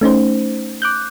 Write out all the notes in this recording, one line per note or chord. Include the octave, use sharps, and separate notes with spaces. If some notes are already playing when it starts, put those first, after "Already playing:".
A3 C#4 D#4 C5
D6 F#6 G6